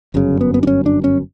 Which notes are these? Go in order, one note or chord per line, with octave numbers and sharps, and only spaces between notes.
G1 F#2 C#3
B3
B3
D4
C#4
D4
C#4